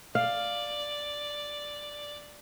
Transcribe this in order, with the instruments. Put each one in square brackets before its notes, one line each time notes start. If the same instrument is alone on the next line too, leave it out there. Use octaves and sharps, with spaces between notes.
[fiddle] D5 [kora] F5